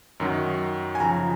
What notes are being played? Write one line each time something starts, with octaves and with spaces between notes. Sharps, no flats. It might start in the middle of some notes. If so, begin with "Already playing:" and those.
F#2 D#3 F#3
G#5
F#2 C#3 F3 A#5